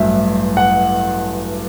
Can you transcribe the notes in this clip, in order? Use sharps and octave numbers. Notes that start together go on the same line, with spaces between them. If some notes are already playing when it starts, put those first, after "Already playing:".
Already playing: A1 G2 F#3 A3 E5
F#5